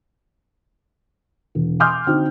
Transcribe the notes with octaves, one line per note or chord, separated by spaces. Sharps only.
E1
G#5 C6 D6 D#6 F6 G6
D3 C4 D#4 F#4